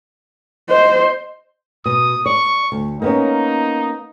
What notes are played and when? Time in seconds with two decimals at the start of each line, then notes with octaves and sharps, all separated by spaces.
0.69 C5 D#5
1.86 B2 D#6
2.26 D5 C#6
2.72 D2
3.02 A#3 B3 C#4 D#4